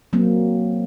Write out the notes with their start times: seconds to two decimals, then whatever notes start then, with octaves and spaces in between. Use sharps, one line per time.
0.13 F#3 A#3 C4